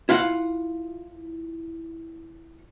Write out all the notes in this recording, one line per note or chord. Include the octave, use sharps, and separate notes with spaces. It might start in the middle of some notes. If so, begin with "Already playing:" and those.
E4 F4 F5 F#5